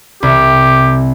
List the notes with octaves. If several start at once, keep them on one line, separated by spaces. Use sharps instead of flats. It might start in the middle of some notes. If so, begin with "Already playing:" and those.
C2 G4